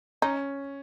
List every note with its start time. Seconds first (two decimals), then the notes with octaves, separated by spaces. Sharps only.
0.22 C#4 D#4